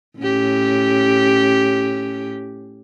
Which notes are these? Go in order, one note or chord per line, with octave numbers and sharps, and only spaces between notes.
A2 C#4 G4